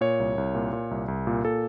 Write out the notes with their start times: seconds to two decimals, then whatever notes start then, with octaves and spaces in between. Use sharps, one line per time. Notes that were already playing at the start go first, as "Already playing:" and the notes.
0.01 A#2 C#5
0.20 C2
0.38 C2
0.55 A#2
0.73 A#2
0.91 C2
1.08 C2
1.27 A#2
1.44 A#2 A4